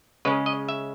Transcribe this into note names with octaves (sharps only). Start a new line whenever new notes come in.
C#3 G#3 C#4 B4
D#5
E5